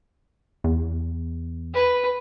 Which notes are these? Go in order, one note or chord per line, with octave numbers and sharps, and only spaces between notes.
E2
B4